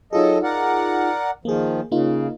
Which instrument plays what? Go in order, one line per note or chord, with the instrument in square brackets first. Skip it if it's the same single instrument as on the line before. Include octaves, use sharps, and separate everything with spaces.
[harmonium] F#3 A4 D#5 [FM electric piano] D#4 F4 G#4
[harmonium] A#4 D5 F#5
[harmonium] D#3 F3 [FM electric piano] A#3 G#4
[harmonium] C#3 [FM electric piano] A#3 D#4 F4